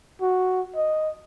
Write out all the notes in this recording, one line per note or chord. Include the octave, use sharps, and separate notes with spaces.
F#4
D#5